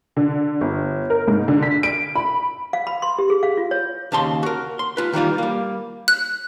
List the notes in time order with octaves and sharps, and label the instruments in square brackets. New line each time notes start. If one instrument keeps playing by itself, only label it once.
[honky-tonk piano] D3
G1
A#4
G#2
D3
B6
D7
B5
[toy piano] F5
B5
C6
G4
G#4
F5
F4
C#5
[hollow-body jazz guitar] D#2 C#3 A5 C6
F#4 A#4
C6
F4 B4
D#3 E3 G3 F4
G3 A#3
[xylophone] F#6